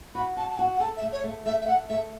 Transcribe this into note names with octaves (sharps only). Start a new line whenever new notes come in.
F#4 B5
F#4 A5
A5
F#4 F#5
F#5
A4 A5
E5
A3
C#5
A3
A3 E5
E5
A3 F#5
A3 E5